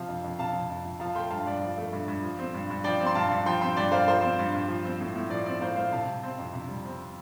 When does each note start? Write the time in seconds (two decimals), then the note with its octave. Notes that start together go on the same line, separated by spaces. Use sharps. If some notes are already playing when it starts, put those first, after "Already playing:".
Already playing: C3 F3 F5 A5
0.09 F2
0.24 F2
0.39 C3 F5 A5
0.54 F3
0.70 F2
0.84 F2
1.00 F3 F5 A5
1.15 A3 G5 C6
1.30 G2 F5 A5
1.46 G2 D5
1.62 F3
1.78 A3
1.93 G2
2.08 G2
2.23 F3
2.39 C4
2.54 G2
2.70 G2
2.84 F3 D5 G5
3.01 C4
3.06 C6
3.15 G2 F5 A5
3.31 G2
3.46 F3 G5 C6
3.61 C4 G5 C6
3.77 G2 D5 G5
3.92 G2 C5 F5
4.08 F3 C5
4.22 C4
4.39 G2
4.54 G2
4.69 F3
4.85 C4
5.00 A2
5.16 A2
5.30 F3 D5
5.46 C4 D5
5.61 A2 C5 F5
5.76 A2 C5 F5
5.92 C3 F5 A5
6.08 G3
6.23 C4
6.39 F2
6.53 C3
6.68 G3
6.85 C4